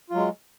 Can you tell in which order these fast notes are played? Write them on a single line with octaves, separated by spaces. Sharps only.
F4 F#3 G#3